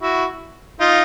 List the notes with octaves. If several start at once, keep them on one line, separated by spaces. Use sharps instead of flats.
E4 F#4
D#4 F4